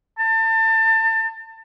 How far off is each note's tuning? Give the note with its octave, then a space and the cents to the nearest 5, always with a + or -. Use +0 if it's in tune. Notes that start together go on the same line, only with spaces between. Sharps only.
A5 +30